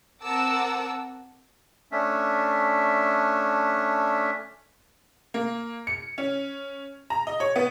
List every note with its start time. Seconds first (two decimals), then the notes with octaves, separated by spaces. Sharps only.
0.23 C4 A#4 F#5 A5 D6 E6
1.92 A3 C#4 D4 E5
5.34 A#3
5.87 C#7
6.18 C#4
7.10 A#5
7.27 D#5
7.40 C#5
7.56 B3